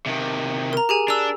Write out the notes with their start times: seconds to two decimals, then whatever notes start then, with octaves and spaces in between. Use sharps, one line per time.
0.06 C3 D#3
0.73 A#4 A#5
0.89 G4 G#4 G#5
1.08 D4 E6 F7